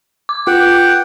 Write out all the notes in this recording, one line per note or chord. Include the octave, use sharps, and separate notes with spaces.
D6
F4 F#5 G5